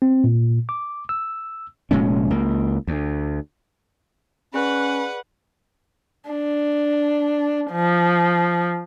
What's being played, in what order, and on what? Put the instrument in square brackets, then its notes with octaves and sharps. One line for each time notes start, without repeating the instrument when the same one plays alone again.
[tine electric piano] C4
A#2
D6
E6
[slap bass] F1 A#2 G#3 C#4
C#2 A#3
D2
[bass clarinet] C#4 [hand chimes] G#4 D5 F#6 [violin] B4 F#5
[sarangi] D4
F3